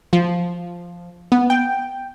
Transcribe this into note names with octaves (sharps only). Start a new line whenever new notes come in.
F3
B3
G5